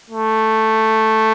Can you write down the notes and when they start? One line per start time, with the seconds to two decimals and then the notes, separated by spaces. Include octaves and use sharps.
0.10 A3